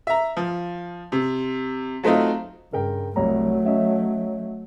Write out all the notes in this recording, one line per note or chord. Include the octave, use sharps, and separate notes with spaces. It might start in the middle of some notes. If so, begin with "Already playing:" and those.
E5 A#5
F3
C3
F#3 A3 C4 D#4 F4
G2 C#3 A#4 G5
C2 F#3 A3 C#5 A#5
C#4 D#5 E5